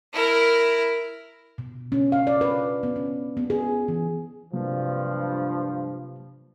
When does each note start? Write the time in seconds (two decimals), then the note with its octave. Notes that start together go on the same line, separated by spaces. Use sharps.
0.13 E4 A#4
1.58 B2
1.92 C#4
2.12 F5
2.27 D5
2.41 B4
2.83 B3
2.96 C#4
3.37 B3
3.50 G#4
3.88 E3
4.53 G2 C3 F3 F#3 A#3